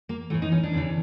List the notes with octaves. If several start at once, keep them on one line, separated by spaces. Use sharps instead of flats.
A#3
A2 E3 A3
D#4
C#4
D4
E2 C#3 E3